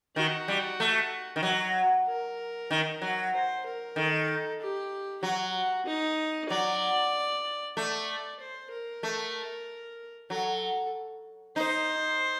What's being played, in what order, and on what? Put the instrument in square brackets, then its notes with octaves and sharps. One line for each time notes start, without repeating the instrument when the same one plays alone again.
[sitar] D#3 [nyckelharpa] F#4
[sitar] G3
A3
D#3
F#3
[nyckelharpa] A#4
[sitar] D#3
F#3
[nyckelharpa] C5
A#4
[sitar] D#3 [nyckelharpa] A4
[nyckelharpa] G4
[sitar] F#3 [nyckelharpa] F#4
[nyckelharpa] D#4
[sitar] F#3 [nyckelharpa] D5
[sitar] A3 [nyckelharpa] D5
[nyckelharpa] C5
A#4
[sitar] A3
[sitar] F#3 [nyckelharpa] A4
[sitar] D#4 [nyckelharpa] C5